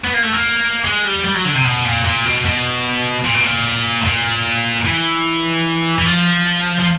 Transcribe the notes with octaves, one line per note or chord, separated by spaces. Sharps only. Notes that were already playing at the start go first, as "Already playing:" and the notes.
B3
A#3
A3
A#3
G#3
G3
G3
F#3
D3
C3
B2
A#2
A#2
B2
B2
A#2
B2
A#2
A2
A#2
E3
E3
F3
F3